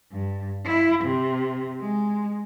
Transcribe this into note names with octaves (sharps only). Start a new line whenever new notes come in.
G2
E4
C3
G#3